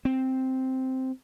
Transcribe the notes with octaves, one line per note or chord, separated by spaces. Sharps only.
C4